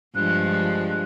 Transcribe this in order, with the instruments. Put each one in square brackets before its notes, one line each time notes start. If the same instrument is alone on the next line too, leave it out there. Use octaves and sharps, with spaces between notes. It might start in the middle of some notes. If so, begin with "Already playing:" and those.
[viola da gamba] G2 F3 G#3 [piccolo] F#6